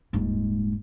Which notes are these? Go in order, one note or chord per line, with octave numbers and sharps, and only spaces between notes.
D#1 G#2